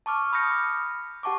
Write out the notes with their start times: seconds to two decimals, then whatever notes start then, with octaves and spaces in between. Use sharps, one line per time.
0.06 A5 C#6 D6 F6
0.32 B5 D#6 F6 G6 A#6 C#7
1.23 G4 F#5 A5 C#6 D6